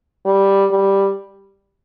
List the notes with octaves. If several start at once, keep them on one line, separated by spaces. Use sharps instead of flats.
G3
G3